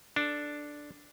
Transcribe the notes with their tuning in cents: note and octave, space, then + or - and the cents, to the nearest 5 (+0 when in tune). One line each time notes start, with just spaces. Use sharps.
D4 +0 A4 +0